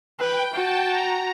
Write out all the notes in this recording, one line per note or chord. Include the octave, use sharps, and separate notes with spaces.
B4 G5
F#4 A5
A#5